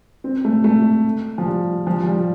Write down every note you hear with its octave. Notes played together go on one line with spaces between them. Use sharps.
C4
A3
A3
F3
G3
F3
F3
G3